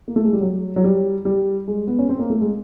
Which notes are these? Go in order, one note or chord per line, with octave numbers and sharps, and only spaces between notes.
A#3
A3
G#3
G3
F#3
F#3
G3
G3
G#3
B3
C#4
C4
A#3
A3
G#3